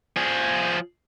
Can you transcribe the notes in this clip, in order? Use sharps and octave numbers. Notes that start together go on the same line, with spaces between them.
F3 G#4